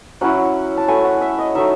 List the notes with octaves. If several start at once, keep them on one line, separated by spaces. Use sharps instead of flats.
F#3 C#4 E4 F#5
A5
F#3 A3 E4 G#5
F#5
E5
D#5
F#3 A3 D#4 E5